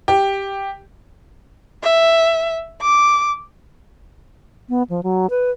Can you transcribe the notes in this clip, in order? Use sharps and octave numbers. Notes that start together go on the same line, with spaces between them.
G4
E5
D6
B3
F3
F#3
B4